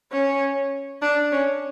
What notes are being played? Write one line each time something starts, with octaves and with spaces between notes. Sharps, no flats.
C#4
D4
C#4